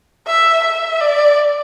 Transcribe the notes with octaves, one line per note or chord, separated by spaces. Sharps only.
E5
E5
D5